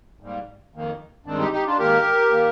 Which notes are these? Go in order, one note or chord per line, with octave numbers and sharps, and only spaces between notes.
G#2 G3 A#3
F2 D#3 A#3
G2 D#3 G#3 C4 D4
D#4 G4
D#4 G4
D4 F4
G#2 D#3 A#3 G4 A#4
D#3 A#3